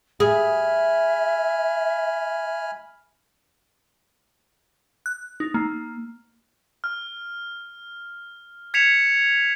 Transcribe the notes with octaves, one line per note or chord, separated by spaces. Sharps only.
G#4 E5 G#5 B5 F6
F#6
D#4
A#3
F6
G#6 B6 C#7 E7 F7